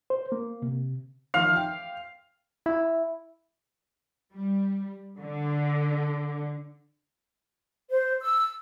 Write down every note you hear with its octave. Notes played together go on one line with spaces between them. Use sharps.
C5
A#3
C3
D#3 F3 F5
G5
E4
G3
D3
C5
E6